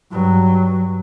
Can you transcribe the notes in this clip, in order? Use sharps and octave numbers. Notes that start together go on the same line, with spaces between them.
G2 F#3